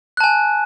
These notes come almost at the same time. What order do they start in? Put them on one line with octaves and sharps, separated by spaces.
F#6 A5 G#5